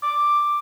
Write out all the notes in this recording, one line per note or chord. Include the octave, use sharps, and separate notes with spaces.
D6